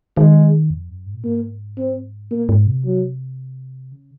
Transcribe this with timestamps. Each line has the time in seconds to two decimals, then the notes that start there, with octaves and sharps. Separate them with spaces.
0.17 D#3 G#3
0.70 F2
0.89 F#2
1.06 G#2
1.14 A#2
1.23 G#2 A#3
1.78 C4
2.31 A#2 A#3
2.49 G#2
2.67 C3
2.85 F#3
3.92 C#3